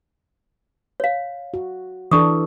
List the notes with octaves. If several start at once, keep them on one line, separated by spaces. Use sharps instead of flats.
C#5 F5
F#4
E3 D4 A4 C#6 D#6